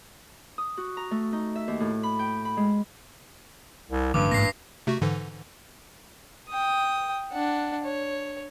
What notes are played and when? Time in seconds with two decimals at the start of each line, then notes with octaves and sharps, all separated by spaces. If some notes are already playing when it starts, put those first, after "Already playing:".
0.58 D#6
0.77 F#4
0.97 A#5
1.11 A3
1.33 D#4
1.55 E5
1.68 D#2
1.80 A2
2.03 B5
2.19 G5
2.45 B5
2.57 G#3
3.90 C2
4.14 A1 G2 D3 F#3 D6
4.32 A1 G#2 A#3 A#6 C7
4.87 C3 A3 F#4
5.01 G#2 D3 E3
6.50 G5 D#6
7.32 D4 F#5
7.84 C#5